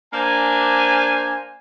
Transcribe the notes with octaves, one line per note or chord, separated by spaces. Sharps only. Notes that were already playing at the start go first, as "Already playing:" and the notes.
A#3 D4 C5 G#5